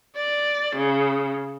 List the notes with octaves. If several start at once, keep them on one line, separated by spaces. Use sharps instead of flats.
D5
C#3